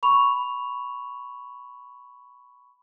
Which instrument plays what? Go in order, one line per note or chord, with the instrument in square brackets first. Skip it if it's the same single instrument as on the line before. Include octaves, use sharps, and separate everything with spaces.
[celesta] B5 C#6 F7